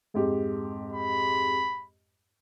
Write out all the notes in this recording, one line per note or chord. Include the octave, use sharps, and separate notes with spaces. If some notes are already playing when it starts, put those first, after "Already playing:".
F2 G#2 G4
B5